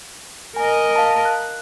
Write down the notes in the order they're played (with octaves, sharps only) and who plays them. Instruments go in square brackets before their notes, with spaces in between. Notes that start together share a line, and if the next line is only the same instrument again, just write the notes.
[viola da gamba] A#4 D#5 [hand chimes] G#5
[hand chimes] F5 A5
F#6